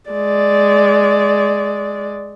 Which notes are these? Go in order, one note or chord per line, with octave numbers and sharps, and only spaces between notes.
G#3 D5